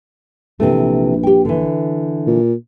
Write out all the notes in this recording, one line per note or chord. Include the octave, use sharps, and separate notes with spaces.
A#1 C3 E3 A3
G4 G5
D3 E3
A#2